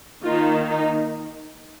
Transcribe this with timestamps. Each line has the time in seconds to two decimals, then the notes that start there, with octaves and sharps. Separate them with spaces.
0.23 D#3 A#3 D#4 F4
0.69 D#4